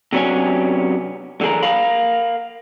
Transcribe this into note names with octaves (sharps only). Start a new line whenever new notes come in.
C3 F#3 B3 C#4 D4 G#5
D3 E3 G#4 A#4
A#4 F5 B5